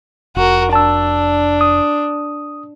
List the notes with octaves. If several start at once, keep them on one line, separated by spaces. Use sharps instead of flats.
F1 F#4 A#4
D4 A5 E6
D#6